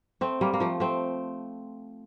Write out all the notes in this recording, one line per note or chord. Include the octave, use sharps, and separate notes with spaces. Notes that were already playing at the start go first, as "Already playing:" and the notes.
A3 C4
G3 A#3
A#3
F3 A3
A3 C4